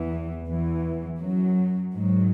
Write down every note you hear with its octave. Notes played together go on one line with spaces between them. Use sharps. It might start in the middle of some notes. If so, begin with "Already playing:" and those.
Already playing: E2 E3
E2 E3
F#2 F#3
G#2 F#3